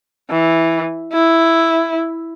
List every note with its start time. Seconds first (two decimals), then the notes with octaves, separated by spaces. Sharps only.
0.30 E3
1.13 E4